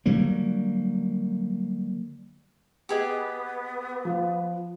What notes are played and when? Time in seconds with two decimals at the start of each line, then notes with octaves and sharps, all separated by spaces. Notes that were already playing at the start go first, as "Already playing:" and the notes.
0.06 D3 F#3 G3 A#3
2.89 B3 G4 G#4 D#5
4.05 F3